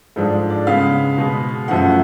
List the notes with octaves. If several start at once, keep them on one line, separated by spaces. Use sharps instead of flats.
G#2 F3 G#3 D4 A4
D5
C#3 G#3 B3 F5
B2 G#3 B3
F#2 F3 A3 F#5